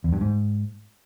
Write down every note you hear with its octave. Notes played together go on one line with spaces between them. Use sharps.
E2
G2
G#2